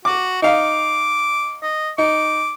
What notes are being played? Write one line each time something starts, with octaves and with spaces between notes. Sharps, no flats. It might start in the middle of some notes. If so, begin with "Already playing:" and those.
F#4 D6
D#4 F5 D6
D#5
D#4 D6